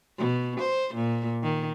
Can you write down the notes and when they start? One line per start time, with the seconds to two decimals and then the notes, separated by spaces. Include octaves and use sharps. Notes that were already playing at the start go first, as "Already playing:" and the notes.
0.18 B2
0.60 C5
0.94 A#2
1.43 D#3